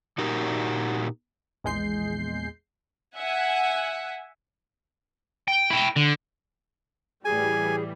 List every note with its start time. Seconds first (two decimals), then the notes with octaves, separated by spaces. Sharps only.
0.18 A#2 D#4 F#4 G4 A#4
1.64 A#1 E2 G#3 G6 C7
3.15 E5 F#5 G#5
5.48 G5
5.70 E4 G5
5.96 D3
7.25 A2 E3 G3 G#4 G#5